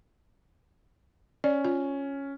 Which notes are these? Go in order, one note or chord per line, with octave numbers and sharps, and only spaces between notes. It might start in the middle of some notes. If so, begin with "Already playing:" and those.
C#4 D5
F4